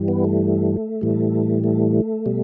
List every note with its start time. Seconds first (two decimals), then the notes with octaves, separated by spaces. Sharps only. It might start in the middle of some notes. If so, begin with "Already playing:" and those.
Already playing: G2 E3 G3
0.08 B3
0.24 A3
1.01 A2 E3 G3
1.64 A3
2.26 B2 G3